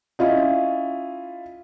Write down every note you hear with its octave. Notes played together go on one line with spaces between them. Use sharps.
C#4 E4 F4 D#5